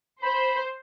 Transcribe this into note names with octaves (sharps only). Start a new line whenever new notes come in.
C5 B5